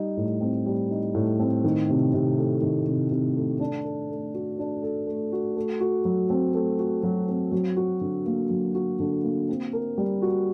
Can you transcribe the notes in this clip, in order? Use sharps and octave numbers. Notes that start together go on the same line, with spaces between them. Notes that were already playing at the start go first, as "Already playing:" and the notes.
Already playing: G3 D#4
A2
C4
G3
D#4
A2
C4
D#3
C3
C3
A3
D#3
C3
C3
A3
D4
A4
A3
F#4
D4
A4
A3
F#4
A3
F#4
F#3
C4
A3
F#4
F#3
C4
F#3
F#4
D3
A#3
F#3
F#4
D3
A#3
C4
A#4
G3
F#4